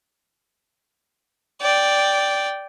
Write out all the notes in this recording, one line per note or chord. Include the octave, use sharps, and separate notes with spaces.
D5 G5